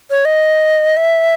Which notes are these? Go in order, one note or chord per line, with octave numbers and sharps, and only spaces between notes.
C#5
D#5
E5